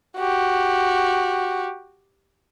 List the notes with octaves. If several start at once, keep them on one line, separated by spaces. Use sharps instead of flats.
F#4 G4